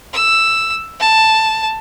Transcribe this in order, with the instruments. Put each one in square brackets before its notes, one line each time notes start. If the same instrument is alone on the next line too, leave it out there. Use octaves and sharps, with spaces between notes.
[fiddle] E6
A5